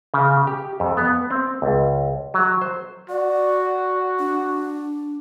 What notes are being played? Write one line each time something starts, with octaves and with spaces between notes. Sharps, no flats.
C#3
G4
F2
B3
C4
C#2
F#3
C5
F#4 D5
D4